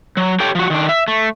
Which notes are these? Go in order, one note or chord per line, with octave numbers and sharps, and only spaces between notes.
F#3
G4 A4 C#5 G5
F3 F#4
D#3 D4
E5
A3